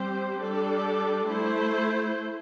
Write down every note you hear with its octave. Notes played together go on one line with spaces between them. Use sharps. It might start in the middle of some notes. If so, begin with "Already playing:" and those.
Already playing: G3 C4 G4 C5
G3 D4 A4 D5
A3 E4 C5